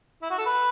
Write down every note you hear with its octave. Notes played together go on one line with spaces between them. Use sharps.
E4
F#4
A4
B4